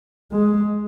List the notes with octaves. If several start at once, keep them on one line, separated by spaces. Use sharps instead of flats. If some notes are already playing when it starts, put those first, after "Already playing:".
G#3